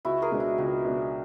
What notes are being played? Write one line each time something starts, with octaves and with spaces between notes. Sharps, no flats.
C#2 E4 F#4
G#4 A#4
B2 G#3 B3 D4
E4
C#2 E4
B2 G#3 B3 D4